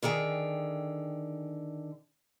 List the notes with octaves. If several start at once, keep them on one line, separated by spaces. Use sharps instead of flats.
D3 D#3 G#4 G5